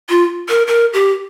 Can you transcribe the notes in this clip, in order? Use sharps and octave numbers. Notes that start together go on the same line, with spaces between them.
F4
A#4
A#4
G4